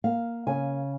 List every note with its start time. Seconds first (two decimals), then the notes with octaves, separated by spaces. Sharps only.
0.04 A#3 F5
0.47 C#3 G#5